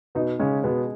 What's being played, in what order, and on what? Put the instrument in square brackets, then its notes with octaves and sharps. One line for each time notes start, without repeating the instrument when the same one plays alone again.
[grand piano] B2 B3 [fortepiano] D#4
[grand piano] C#3 C#4 [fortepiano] G#3
[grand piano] B2 B3 [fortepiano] G#3